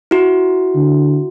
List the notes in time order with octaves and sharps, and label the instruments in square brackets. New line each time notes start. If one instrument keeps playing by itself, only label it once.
[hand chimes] E4 F#4
[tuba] D3